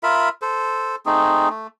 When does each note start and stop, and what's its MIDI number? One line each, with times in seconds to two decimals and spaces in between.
0.03 0.29 65
0.03 0.29 70
0.03 0.29 76
0.03 0.29 83
0.42 0.96 69
0.42 0.96 72
1.06 1.49 57
1.06 1.49 60
1.06 1.49 63
1.06 1.49 68
1.50 1.67 57